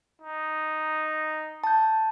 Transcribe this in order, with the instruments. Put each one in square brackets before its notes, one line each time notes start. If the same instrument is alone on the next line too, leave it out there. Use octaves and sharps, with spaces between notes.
[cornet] D#4
[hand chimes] A5 G6